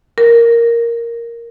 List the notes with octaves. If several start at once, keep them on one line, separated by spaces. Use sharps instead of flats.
A#4